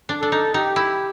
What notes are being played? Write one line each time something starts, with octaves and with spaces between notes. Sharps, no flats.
D4
D4 A4
D#4
D#4 G4
E4